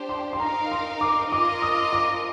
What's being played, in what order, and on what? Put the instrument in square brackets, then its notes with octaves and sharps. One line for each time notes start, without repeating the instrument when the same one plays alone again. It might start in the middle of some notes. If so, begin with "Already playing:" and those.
Already playing: [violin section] D4 G4 C5
[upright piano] C6
C6
[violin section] D#4 A#4 F5 [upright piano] A#5
[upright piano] C6
D6
[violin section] F4 A#4 D#5 [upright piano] D6
[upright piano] D#6
D6